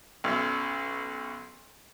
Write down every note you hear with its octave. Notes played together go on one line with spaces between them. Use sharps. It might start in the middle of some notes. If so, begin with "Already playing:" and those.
B1 F#2